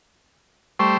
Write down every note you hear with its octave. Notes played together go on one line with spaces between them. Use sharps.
G3 A3 C5 C#6